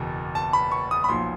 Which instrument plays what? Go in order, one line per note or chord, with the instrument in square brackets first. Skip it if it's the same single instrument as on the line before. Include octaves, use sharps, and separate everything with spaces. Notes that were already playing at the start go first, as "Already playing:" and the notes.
Already playing: [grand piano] F#1 E2 B2
A5
B5
C#6
D#6
B5
B1 A#2 F3 C6